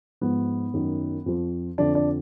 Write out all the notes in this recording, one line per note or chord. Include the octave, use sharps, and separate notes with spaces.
G#2 F3 B3
F#2 D#3 F#3
F2 F3
F2 D3 F3 D4
D4